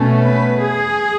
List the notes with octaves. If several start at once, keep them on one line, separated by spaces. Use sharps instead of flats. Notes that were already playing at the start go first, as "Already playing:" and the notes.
Already playing: B2 A3 C#4
B4
G#4